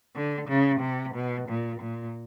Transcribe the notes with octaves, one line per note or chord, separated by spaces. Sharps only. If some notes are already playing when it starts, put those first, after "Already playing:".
D3
C#3
C3
B2
A#2
A#2